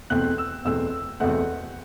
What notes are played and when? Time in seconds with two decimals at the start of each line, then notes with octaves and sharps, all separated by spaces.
0.10 E2 B2 A3 C4 F#6
0.38 E6
0.65 E2 B2 A3 C4 E6
1.20 E2 B2 A3 C4 F#5